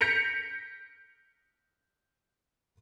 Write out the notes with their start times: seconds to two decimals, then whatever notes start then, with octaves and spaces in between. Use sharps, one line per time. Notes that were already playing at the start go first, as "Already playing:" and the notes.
0.01 G6 A#6 B6 C#7 D7 F7